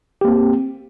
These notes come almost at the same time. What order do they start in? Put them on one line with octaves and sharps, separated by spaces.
G4 A#3 C4